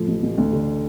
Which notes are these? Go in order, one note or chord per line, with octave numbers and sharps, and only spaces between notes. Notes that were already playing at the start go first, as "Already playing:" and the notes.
Already playing: A2 F3
A1
A1
D2
D3